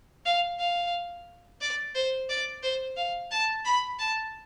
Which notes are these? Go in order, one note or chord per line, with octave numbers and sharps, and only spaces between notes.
F5
F5
D5
C5
D5
C5
F5
A5
B5
A5